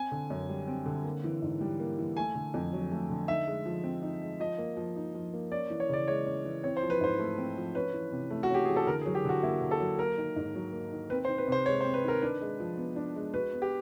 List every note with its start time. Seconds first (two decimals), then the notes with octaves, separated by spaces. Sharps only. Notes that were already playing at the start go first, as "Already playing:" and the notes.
Already playing: C4 G#5
0.12 D3
0.30 F#2
0.49 G3
0.68 C4
0.86 D3
1.04 A#3
1.24 E3
1.42 G#2
1.61 G3
1.80 A#3
1.99 E3
2.17 A3 G#5
2.35 D3
2.54 F2
2.73 F#3
2.92 A3
3.10 D3
3.28 D#4 E5
3.47 G#3
3.66 F3
3.84 C4
4.02 D#4
4.22 G#3
4.40 F3 D#5
4.58 A#3
4.77 F3
4.96 D#4
5.15 F3
5.34 A#3
5.52 C#4 D5
5.70 E3
5.80 C#5
5.89 C#3 D5
6.07 G#3 C#5
6.26 C#4
6.45 E3
6.63 C4 C#5
6.76 C5
6.82 F3
6.90 B4
7.01 G#2 C5
7.19 A3
7.38 C4
7.57 F3
7.75 C#4 B4
7.93 E3
8.12 C3
8.30 A3
8.43 F#4
8.50 C#4 G4
8.65 E3 G#4
8.76 A4
8.87 D3 A#4
9.01 G#4
9.06 F#3
9.15 G4
9.25 D3 F#4
9.42 A#3 E4
9.61 D3
9.71 A4
9.80 F#3
9.99 A#3 A#4
10.18 D#3
10.36 G#2
10.55 F#3
10.73 A#3
10.92 D#3
11.10 C4 B4
11.25 C5
11.28 D#3
11.38 B4
11.47 C3 C5
11.66 G#3 C#5
11.81 C5
11.84 C4
11.94 B4
12.04 D#3 A#4
12.22 D4 B4
12.41 G#3
12.60 F3
12.77 B3
12.96 D4
13.16 G#3
13.34 F#4 B4
13.53 B3
13.62 G4